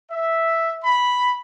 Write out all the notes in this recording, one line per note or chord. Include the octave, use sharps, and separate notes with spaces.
E5
B5